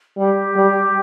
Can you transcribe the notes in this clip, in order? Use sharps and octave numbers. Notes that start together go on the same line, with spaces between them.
G3 G4
G3